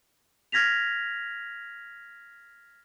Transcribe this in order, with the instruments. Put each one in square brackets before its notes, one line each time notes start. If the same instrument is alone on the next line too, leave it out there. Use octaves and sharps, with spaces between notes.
[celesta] F6 G#6 A#6 B6 F7